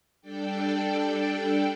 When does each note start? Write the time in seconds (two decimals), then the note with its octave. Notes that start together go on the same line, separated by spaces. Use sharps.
0.21 G3 D4 A4 D5 G5